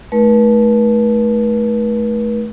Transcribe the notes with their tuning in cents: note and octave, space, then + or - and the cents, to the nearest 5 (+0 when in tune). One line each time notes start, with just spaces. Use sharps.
A3 -20 E4 -45 B4 -40